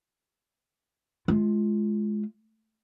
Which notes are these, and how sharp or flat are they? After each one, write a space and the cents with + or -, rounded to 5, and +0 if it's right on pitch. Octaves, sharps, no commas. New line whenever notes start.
G#3 +20 F4 -15